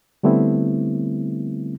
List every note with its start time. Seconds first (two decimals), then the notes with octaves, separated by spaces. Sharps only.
0.23 D3 G3 A3 B3 C4 E4